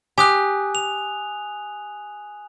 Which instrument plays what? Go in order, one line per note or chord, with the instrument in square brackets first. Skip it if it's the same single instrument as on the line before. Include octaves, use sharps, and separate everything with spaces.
[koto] G4 [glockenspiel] G#5 D#6 F#6
[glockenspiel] F7